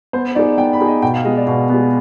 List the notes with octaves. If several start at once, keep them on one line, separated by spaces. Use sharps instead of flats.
B3 C5
D#4 G#4 D5
B3 G5
B5
D#4 G#4
D#5
B2 G5
F5
G#3 B3 D#5
D5
B2 F5
G#3 B3